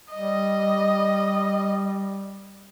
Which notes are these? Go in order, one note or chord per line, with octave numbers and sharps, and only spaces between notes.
G3 D#5